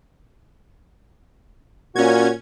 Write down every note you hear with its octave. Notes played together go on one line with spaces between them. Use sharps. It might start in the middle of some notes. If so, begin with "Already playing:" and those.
A#2 C#4 F#4 G#6